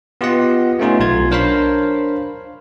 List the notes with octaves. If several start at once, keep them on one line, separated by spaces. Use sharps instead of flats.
B3 F4 G4 D#5 F#5
A3 B3 C#4 D#4 F4
B1 F4 G#6
D4 A#4 C5 C#5 F5 B5